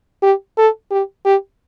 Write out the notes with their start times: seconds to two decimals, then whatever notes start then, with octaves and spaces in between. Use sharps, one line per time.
0.22 G4
0.58 A4
0.91 G4
1.25 G4